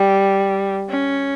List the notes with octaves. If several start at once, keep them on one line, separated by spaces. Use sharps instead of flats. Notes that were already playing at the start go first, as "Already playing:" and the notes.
Already playing: G3
C#4